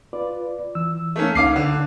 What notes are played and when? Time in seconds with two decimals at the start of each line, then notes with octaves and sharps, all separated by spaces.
0.13 F4 B4 D5
0.75 E3 E6
1.16 A3 A#3 C#4
1.35 C#2 D#4 F5 D6 C7
1.56 D3 F#5